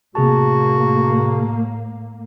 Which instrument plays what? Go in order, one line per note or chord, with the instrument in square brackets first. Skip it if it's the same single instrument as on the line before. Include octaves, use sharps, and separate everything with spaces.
[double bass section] A2 A#3 [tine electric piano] C3 G#4 A5 [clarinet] F#4